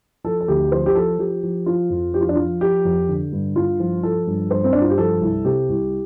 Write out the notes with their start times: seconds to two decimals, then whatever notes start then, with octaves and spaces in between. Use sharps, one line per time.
0.24 F3 A4
0.41 A4
0.48 D2 G4
0.72 F3 C5
0.86 G4
0.95 F3 A4
1.19 F3 G4
1.43 F3
1.66 F3 F4
1.90 F2
2.14 F3 G4
2.21 F4
2.29 D4
2.35 F3 F4
2.61 F3 G4
2.85 F2
3.09 D3
3.32 G2
3.56 G2 F4
3.80 F3
4.03 F3 A4
4.27 G2
4.50 G2 C5
4.64 C4
4.73 G2 D4
4.81 F4
4.90 G4
4.97 F3 A4
5.21 C2
5.45 C3 G4
5.69 C2